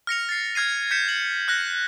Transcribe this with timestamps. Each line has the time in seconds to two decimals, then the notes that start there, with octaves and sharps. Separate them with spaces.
0.07 F6 A#6 C#7 F7
0.29 A6 C7
0.55 F6 G#6 C7 D#7
0.91 G6 B6 C#7 E7
1.09 F#7
1.48 F6 F#6 A#6